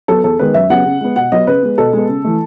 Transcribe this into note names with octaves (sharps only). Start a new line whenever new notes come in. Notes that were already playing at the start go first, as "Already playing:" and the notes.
F#3 B3 A4
E2 A4
D#3 G#3 B3 B4
F#2 E5
C#3 F#3 B3 F#5
C#3
G#3 B3
B2 F#5
F#3 B3 D#5
C#3 B4
G#3 B3
B2 A4
G#3 B3
C#3
E3 A3